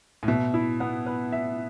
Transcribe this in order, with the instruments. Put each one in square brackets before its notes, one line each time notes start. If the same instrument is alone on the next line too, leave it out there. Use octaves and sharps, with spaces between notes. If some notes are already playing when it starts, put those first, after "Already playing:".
[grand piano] A2
[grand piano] B2 [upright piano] E5
[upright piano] E4
B3
B4
E5